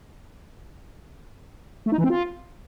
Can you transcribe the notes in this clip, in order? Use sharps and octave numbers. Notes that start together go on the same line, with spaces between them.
A3
D#4
E3
C4
F4